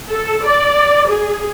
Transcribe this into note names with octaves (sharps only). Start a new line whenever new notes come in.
A4
D5
G#4